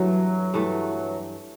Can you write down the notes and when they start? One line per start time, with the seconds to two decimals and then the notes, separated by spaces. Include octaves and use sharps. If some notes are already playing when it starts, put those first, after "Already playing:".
Already playing: G2 E3 F#3 A3
0.54 G2 E3 A3